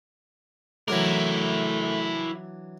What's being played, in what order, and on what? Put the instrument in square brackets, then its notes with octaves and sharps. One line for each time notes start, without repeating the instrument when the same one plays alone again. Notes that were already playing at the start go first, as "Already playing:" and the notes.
[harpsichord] E3 F#3 D4 [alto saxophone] A3 [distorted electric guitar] E4 A#4